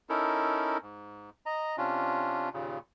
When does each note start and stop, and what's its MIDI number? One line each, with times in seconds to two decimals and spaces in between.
0.09 0.78 61
0.09 0.78 63
0.09 0.78 64
0.09 0.78 69
0.09 0.78 70
0.82 1.30 44
1.46 1.76 75
1.46 1.76 82
1.77 2.49 48
1.77 2.49 61
1.77 2.49 62
1.77 2.49 65
2.53 2.79 39
2.53 2.79 46
2.53 2.79 49